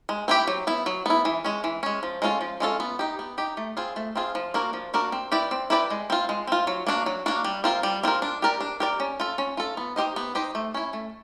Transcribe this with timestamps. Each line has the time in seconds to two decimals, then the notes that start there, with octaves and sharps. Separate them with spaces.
0.09 G#3
0.28 C4 E4 G4
0.47 F#3
0.67 B3 E4
0.86 F#3
1.06 B3 E4
1.25 E3
1.44 G#3 C#4
1.64 E3
1.83 G#3 C#4
2.03 F3
2.22 G#3 C#4 F4 A4
2.41 F3
2.60 G#3 C#4 F4 A4
2.80 B3
2.99 D#4 G4
3.19 B3
3.38 D#4 G4
3.57 A3
3.77 C4 F4 G#4
3.96 A3
4.15 C4 F4 G#4
4.35 F3
4.54 A#3 D4 F#4 A#4
4.73 F3
4.94 A#3 D4 F#4 A#4
5.12 C4
5.32 E4 G4 B4 D5
5.51 C4
5.70 E4 G4 B4 D5
5.90 G#3
6.10 C4 F4
6.29 G#3
6.47 C4 F4
6.67 F#3
6.87 A#3 D4 F#4
7.06 F#3
7.26 A#3 D4 F#4
7.44 G3
7.64 C4 F4 A#4
7.83 G3
8.03 C4 F4 A#4
8.22 D4
8.42 G4 A#4 D5
8.61 D4
8.80 G4 A#4 D5
9.00 C#4
9.20 F4 A4
9.38 C#4
9.57 F4 A4
9.77 B3
9.96 D#4 G4 C5 D#5
10.16 B3
10.35 D#4 G4 C5 D#5
10.55 A3
10.74 C#4 E4
10.93 A3